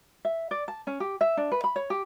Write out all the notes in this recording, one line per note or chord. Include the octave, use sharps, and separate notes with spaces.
E5
D5
A5
C#4
G4
E5
D4
B4
B5
C#5
G4